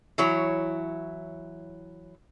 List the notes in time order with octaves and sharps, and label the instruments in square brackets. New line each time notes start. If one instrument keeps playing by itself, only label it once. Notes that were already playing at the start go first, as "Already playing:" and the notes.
[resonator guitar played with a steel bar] E3 F#3 E4 C#5